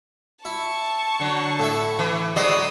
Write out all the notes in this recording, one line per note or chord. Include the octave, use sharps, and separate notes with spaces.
E4 A5 C#6
D3 F#3
A2 E4 E5
E3
F#3 G#3 E4 C5 D5 D#5 D#6 E6